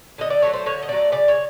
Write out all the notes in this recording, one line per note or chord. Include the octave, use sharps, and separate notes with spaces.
D3 D#5
D5
F#3 A3 C#5
C5
D3 C#5
D#5
F#3 A3 D5
C#3 D5
C#5